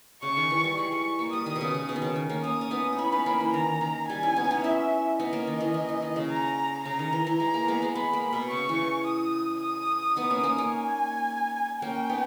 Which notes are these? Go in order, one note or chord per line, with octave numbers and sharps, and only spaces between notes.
C#3 C#6
D#3
E3
G3
G#3 C#6
G3
A#3
G3 D#6
D#3
B2
C#3
C#3
B2
D#3
C#3
D#3
A#3 C#4
A#3 C#4 D#6
C#4
B3 D#4
D#4
C#4 E4 B5
B3 D#4
A#3 C#4
E3
D#3 A#5
D#3
G3 G#5
C#4 E4
B3 D#4
C#4
B3 D#4
C#4 E4 E5
B3 D#4 D#5
A#3 C#4
D#3
E3
E3
E3
D#3
C#3
A#5
C#3 A#5
D#3
E3
E3
G#3 A#5
A#3
G#3 B3
G#3 B3
G#3 B3 B5
A#3
B2
C#3 C#6
E3
D#6
D#6
B3 D#4
A#3 C#4
A#3 C#4
A#3 C#4
G#5
A#3 C#4 G5
B3 D#4